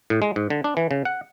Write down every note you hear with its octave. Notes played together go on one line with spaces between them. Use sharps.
A2
G#3
G#2
D3
D4
E3
C#3
F#5